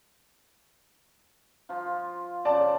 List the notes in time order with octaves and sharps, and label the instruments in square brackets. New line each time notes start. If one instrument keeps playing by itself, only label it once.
[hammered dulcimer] F3 F4
[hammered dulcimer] C#3 F3 [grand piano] D5 A5